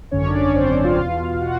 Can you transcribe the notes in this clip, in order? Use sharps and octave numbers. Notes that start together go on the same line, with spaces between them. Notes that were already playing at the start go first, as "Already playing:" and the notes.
G#1 F#2 D3 C#4 C#5
D4 D5
C#4 C#5
C4 C5
C4 C5
F4 F5
E2 B2
F#4 F#5